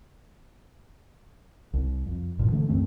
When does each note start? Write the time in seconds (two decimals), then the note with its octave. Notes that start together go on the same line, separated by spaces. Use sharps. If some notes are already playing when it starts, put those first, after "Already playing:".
1.73 C2
2.06 F2
2.39 C2 G2 A#2 F3
2.52 D3 E3 A3
2.69 C2 F#2 A3 C4